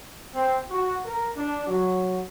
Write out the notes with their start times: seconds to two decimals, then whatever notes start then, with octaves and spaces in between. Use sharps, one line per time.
0.34 C4
0.70 F#4
1.05 A#4
1.35 D4
1.67 F#3